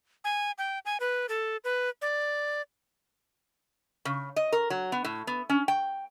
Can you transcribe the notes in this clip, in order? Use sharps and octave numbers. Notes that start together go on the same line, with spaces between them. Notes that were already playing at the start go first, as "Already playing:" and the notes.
G#5
G5
G#5
B4
A4
B4
D5
C#3
D#5
A#4
F#3
B3
A2
B3
C#4
G5